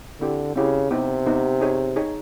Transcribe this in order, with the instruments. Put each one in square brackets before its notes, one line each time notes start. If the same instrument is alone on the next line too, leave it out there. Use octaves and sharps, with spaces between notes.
[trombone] D3 [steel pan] C4 E4 G4
[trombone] C#3 [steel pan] C4 E4 G4
[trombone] C3 [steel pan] B3 D#4 G4
[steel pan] B3 D#4 G4
D#4 G#4 C#5
D#4 G#4 C#5